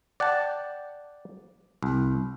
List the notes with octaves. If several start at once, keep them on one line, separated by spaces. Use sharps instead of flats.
D5 F#5 G5 A5
C2